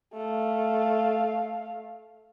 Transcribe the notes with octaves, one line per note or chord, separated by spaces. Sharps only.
A3 F5